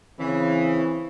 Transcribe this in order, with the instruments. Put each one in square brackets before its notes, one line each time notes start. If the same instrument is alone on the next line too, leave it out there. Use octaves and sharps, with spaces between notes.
[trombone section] C#3 [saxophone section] E3 [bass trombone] C4